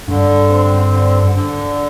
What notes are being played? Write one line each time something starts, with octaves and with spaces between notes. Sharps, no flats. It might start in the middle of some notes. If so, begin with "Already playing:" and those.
G2 D3
C4
D3
D3